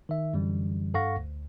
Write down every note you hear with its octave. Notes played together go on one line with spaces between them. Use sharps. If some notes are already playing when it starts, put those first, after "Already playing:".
D#3 E5
F#2 D3 E3 G3
G2 A4 F5 F#5 C#6 A#6
D2